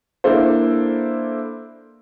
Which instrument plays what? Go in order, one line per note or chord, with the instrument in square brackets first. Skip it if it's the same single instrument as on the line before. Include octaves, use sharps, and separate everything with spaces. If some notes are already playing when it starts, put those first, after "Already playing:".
[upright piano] A#3 D4 E4 A4 A#4 C5